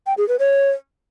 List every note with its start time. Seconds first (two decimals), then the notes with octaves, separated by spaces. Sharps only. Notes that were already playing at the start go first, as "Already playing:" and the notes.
0.07 G5
0.18 G#4
0.28 B4
0.39 C#5